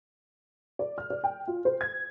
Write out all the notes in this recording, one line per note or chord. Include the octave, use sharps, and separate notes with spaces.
D5
F6
D5
G5
F4
C5
G#6